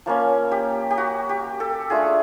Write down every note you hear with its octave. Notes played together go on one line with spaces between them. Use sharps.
F3 A#3 C#4
G4
G4
F#4
G4
A4
A3 D4 F4 G#4